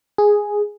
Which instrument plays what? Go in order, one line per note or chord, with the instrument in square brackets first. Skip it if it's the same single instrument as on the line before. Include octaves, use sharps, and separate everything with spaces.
[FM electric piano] G#4